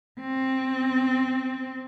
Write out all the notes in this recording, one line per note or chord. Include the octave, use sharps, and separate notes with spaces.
C4